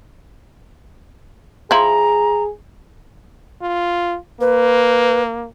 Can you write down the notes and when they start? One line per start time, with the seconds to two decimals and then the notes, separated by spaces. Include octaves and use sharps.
1.71 F3 E4 G#4 A#5
3.62 F4
4.41 A#3 B4